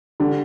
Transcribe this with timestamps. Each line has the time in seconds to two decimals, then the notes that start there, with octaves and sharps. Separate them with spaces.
0.20 D3 G3